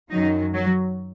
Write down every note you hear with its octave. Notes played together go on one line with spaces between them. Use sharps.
F#2 D#3 F#3 D#4
F#3